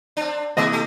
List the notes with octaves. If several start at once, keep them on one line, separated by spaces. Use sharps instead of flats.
C4 D4
C3 E3 A#3 B3 E4 G#4 D#5
A3 G4